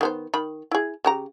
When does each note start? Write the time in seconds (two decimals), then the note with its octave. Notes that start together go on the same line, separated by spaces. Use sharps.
0.01 D#3 B3 C5
0.34 D#3 B5
0.71 E4 G#4
1.05 C#3 G4 A#5